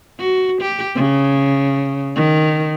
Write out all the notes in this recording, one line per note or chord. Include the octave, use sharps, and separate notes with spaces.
F#4
G4
C#3
D#3